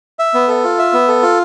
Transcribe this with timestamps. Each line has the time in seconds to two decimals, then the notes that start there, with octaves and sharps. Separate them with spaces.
0.19 E5
0.34 B3
0.48 A4
0.64 F4
0.79 E5
0.93 B3
1.08 A4
1.22 F4